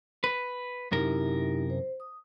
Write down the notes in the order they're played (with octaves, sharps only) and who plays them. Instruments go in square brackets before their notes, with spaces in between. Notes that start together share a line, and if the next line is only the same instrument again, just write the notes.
[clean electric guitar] B4
[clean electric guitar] F#2 C3 A#4 [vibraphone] D#4 E4 G4
[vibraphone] C5
D#6